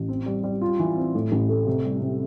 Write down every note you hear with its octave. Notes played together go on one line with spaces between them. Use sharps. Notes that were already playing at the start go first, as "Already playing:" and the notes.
Already playing: A1
C4
G3
G3
F4
E3
C4
A2
A1
A3
C3
G3
C3